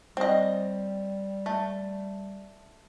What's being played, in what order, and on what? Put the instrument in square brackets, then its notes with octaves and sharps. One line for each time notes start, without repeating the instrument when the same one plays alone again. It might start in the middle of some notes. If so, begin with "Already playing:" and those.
[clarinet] G3 [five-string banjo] C4 D#5
[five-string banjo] A3